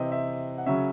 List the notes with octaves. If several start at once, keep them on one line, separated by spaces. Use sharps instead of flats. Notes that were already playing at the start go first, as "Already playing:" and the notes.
Already playing: C3 E3 C4 D#5 E5
E5
F#5
C#3 F#3 C#4 E5